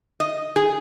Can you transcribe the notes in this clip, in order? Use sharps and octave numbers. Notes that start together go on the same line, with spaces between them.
D#5
G#4